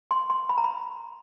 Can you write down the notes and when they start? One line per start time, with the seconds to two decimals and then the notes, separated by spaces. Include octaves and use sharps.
0.11 C6
0.30 C6
0.49 B5
0.58 A#5
0.64 B5